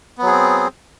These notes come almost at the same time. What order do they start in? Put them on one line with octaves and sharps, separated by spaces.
B3 F#3 G#4 C4